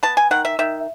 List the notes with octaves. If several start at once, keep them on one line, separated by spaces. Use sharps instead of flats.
B3 A5
G#5
D#3 F#5
E5
D#3 E5